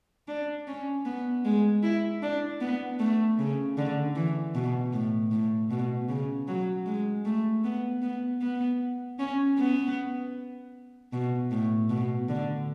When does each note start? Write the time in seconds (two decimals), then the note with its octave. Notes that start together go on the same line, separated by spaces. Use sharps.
0.28 D4
0.67 C#4
1.06 B3
1.45 G#3
1.83 E4
2.22 D4
2.61 B3
2.99 A3
3.38 C#3
3.77 D3
4.16 E3
4.55 B2
4.93 A2
5.31 A2
5.70 B2
6.09 C#3
6.48 F#3
6.86 G#3
7.25 A3
7.64 B3
8.02 B3
8.41 B3
9.19 C#4
9.58 B3
11.13 B2
11.51 A2
11.90 B2
12.29 D3